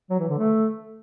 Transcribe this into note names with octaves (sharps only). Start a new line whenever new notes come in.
F#3
E3
D3
A3